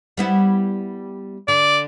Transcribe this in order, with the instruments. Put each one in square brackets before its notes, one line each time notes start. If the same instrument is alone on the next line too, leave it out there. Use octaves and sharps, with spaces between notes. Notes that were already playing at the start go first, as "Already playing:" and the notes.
[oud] G3 B3 E4
[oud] D3 [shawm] D5